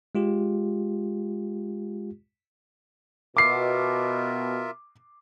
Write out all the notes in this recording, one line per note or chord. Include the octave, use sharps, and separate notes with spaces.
G#3 F4 G4
B2 F4 A#4 E5 D6 C7